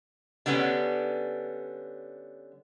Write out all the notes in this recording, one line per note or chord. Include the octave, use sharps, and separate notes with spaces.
D3 G3 B3 C#4